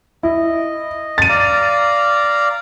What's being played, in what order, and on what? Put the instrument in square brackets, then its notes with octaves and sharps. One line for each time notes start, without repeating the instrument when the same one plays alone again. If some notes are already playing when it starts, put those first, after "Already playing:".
[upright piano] E4 [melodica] D#5
[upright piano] A6 D#7
[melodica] D5 F5 A#5